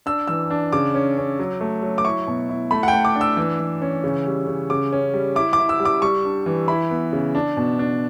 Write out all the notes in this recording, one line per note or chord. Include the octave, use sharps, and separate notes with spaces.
D4 E6
E3 E6
D4
C#3 D6
C#4
C#4
F#3
A3
F#3
D6
E4 C#6
B2
E4
A3 B5
F#5
G5
A3
D6
D4
E6
E3
E3
C#4
C#3
G3
C#3
C#3 D6
C#4
G3
E4 D6
D6
E4
E6
G3
D6
G3 C#6
D4
E3
E4 B5
B3
C#3
D4
B2
D4